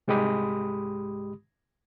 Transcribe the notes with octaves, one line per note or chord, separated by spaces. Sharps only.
C2 G#2 G#3 G4 B5 D#6